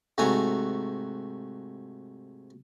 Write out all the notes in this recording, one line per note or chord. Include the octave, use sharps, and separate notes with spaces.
G#2 C3 A3 F#4 G#5 A#5